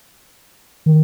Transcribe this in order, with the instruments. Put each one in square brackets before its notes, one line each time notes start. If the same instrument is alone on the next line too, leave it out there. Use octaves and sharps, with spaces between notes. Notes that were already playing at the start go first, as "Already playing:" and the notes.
[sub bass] D#3